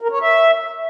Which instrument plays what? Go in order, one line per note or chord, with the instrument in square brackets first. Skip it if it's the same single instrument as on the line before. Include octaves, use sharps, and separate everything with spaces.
[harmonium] A#4
C#5
E5